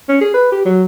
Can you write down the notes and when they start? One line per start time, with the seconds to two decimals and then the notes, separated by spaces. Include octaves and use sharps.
0.09 C#4
0.21 G#4
0.34 B4
0.52 G4
0.65 F#3